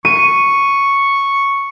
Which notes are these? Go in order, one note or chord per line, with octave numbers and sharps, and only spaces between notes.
C#6 D#7